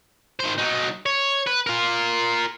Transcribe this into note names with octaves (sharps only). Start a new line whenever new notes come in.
D#3 C5
F#3 D#4
C#5
B4
F4 A#4